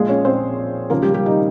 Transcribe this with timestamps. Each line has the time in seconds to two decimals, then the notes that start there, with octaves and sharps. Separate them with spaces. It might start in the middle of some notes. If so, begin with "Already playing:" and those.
Already playing: A#1 A#2 F3 G#3 G#4
0.09 C#4 C#5
0.25 C4 C5
0.90 D#2 C#3 F3 A#3 A#4
1.03 G3 G4
1.14 G3 G4
1.26 D#3 D#4